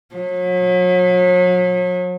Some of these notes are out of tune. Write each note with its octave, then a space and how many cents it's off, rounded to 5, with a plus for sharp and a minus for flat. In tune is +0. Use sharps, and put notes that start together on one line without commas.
F#3 -40